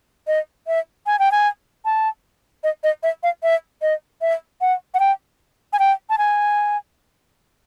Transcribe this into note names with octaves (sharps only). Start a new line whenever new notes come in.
D#5
E5
G#5
G5
G#5
A5
D#5
D#5
E5
F5
E5
D#5
E5
F#5
F#5
G5
G#5
G5
A5
G#5